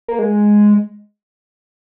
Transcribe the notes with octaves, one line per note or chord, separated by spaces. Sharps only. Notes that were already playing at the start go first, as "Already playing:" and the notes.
A#3
G#3